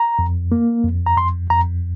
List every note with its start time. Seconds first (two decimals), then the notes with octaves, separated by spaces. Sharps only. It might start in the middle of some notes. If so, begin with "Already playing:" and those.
Already playing: A#5
0.19 F2
0.52 A#3
0.84 F2
1.06 A#5
1.17 F2 C6
1.50 F2 A#5